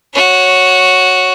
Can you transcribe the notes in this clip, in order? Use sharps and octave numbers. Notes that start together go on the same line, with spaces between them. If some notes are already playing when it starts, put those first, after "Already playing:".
F#4 C#5